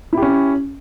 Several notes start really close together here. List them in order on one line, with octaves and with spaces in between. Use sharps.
E4 G4 C#4